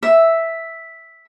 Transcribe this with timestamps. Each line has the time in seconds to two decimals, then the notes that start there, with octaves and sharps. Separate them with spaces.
0.03 E5